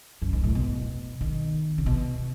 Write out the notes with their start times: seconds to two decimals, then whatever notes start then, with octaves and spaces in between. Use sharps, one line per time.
0.22 F#2
0.33 G#2
0.44 A2
0.55 B2
1.21 D#3
1.78 C#3
1.86 B2